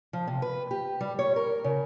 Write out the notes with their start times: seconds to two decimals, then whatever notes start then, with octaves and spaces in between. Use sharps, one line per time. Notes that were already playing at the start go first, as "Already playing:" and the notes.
0.13 F3
0.27 C3
0.42 B4
0.71 G4
1.01 G3
1.19 C#5
1.36 A#4
1.64 C#3